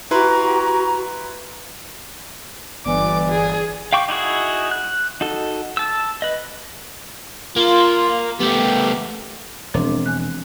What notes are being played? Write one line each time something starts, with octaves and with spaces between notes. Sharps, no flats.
E4 F#4 G4 B4 A#5 C6
G1 E3 D5 D6
G#4
F5 G5 C#6 D6
D#4 E4 F#4 G#4
F#6
D#4 F#4 A4
A5 E6
B4 D#5
A#3 F4
A3 B3 G4
E1 F3 C4 D4
G#5 F#6